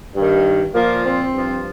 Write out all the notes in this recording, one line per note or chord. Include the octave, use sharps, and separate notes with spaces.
G2
D#3
A#2 F3 A#3
C4
G2 F3